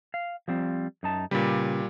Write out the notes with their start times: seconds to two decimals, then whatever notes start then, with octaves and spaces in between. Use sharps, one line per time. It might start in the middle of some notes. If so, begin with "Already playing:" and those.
0.14 F5
0.48 F3 G3 C4
1.03 F#2 D#4 A5
1.31 A#2 C#3 G3 B4